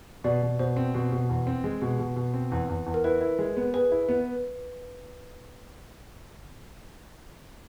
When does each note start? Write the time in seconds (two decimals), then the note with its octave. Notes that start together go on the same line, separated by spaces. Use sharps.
0.24 B2 D5
0.42 B2
0.59 B2 C5
0.77 C4
0.94 B2
1.12 B2
1.29 E2
1.47 C4
1.64 G#3
1.82 B2
1.99 B2
2.16 B2
2.34 C4
2.52 E2
2.69 E2
2.86 E2
2.94 A#4
3.04 E4 B4
3.21 E4
3.39 G#3
3.57 B3
3.74 G#4 B4
3.91 E4
4.09 B3